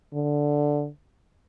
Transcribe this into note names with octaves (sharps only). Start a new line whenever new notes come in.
D3